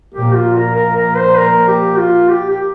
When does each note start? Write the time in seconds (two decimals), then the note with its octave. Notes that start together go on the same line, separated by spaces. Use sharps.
0.15 A#1 A#2 A#3 G4
0.35 F4
0.56 A#4
0.76 A#4
0.96 A#4
1.17 C5
1.38 A#4
1.68 G4
1.99 F4
2.30 G4
2.50 G4